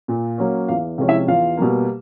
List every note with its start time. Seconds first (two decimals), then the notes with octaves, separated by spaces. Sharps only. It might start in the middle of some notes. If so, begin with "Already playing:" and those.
0.08 A#2
0.38 F#3 A#3 C#4
0.68 E2 F4 F5
0.98 C3 F3 G#3 C#4
1.08 E4 E5
1.28 E2 F4 F5
1.57 B2 G3 A#3